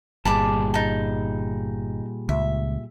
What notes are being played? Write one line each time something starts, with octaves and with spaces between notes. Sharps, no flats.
G1 A#2 G3 G#4 A5 B5 D6
D#4 A5
C#2 E5